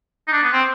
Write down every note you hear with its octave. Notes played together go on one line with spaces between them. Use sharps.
D#4
D4
B3
C4